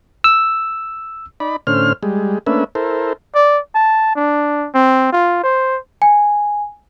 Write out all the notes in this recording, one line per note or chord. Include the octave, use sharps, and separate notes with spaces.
E6
D#4 D5 B5
A2 D3 C#4 C5 F6
G3 G#3
A3 A#3 C#4 D4 B4 E5
E4 A4 A#4 C5
D5
A5
D4
C4
F4
C5
G#5